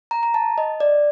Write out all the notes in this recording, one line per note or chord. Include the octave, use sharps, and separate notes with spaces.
A#5
A#5
A5
D#5
D5